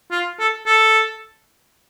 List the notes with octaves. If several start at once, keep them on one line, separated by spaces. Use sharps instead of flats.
F4
A4
A4